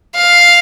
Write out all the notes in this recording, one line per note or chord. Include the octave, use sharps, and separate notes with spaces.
F5